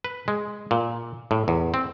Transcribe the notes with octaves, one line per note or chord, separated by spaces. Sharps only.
B4
G#3
A#2
A2
E2
C4